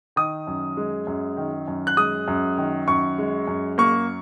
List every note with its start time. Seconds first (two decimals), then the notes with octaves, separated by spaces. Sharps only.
0.16 D#3 D#6
0.47 F#2
0.77 G#3
1.07 F#2
1.37 D#3
1.68 F#2
1.87 F#6
1.97 G#3 D#6
2.28 F#2
2.57 D#3
2.88 F#2 C#6
3.18 G#3
3.47 F#2
3.78 A#3 C#6